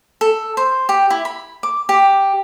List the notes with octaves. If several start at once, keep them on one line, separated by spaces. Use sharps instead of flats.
A4
C5
G4
E4
B5
D6
G4